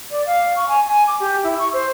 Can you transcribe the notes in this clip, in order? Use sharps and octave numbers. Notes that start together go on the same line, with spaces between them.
D5
F5
C#6
G#5
G#5
D6
G4
E4
C#6
C5